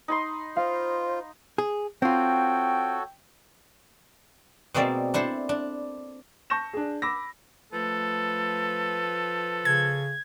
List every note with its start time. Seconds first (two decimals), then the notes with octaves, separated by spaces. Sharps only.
0.08 D#4 B5 C6
0.56 F4 C5 F5
1.58 G#4
2.02 C4 F4 F#4 A4 C#5 G5
4.74 B2 G#3 A#3 C4 D5 E5
5.14 D4 E4 A4 C5
5.49 D4
6.50 A5 C#6 G6 A#6 E7
6.73 D4 G#4
7.02 B5 D6 E6 A#6
7.73 F3 A3 A4 B4
9.65 C#3 G#6